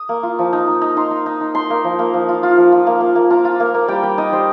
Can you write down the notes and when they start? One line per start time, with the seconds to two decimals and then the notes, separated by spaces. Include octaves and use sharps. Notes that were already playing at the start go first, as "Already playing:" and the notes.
Already playing: D#6
0.09 A#3
0.23 F4
0.39 F3
0.53 D#4
0.67 D#4
0.82 D#4
0.97 D#4 C6
1.11 D#4
1.26 D#4
1.41 D#4
1.55 D#4 C6
1.70 A#3
1.84 F3
1.99 A#3
2.14 F3
2.29 F4
2.43 F4
2.57 F3
2.72 F4
2.87 A#3
3.01 A#3
3.15 A#3
3.30 F4 A#5
3.45 F4
3.60 A#3
3.74 A#3
3.88 G3 G5
4.03 G3 G5
4.18 D#4 D#5
4.33 G3 C5